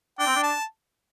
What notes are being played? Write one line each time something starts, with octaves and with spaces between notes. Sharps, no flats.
D4 G5
C4
D4
A5